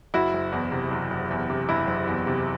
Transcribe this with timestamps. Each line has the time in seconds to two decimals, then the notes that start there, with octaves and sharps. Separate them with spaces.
0.14 F#1 E4 F#4
0.34 F#1
0.52 E2
0.72 C3
0.91 F#1
1.11 F#1
1.31 E2
1.50 C3
1.69 F#1 E4
1.87 F#1
2.07 E2
2.27 C3